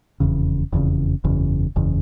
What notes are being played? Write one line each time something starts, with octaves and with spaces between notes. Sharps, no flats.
F1 E2 C#3
F1 E2 C#3
F#1 E2 C#3
F#1 E2 C#3